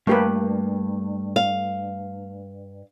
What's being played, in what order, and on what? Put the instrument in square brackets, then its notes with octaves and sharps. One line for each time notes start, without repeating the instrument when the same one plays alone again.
[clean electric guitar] G2 [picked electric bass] A3 [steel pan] A#3 G4 B4
[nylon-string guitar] F5